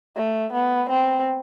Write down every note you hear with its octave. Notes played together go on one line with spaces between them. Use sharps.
A3
B3
C4